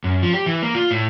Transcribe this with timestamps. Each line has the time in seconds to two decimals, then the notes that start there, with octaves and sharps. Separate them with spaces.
0.04 F#2
0.22 F3
0.33 G4
0.46 E3
0.63 A#3
0.74 F4
0.91 A2